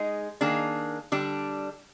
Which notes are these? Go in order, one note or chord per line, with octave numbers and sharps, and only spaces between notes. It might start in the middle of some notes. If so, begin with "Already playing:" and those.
Already playing: G#3 D#4 G#4
D#3 A#3 D4 G#4
D3 G3 D4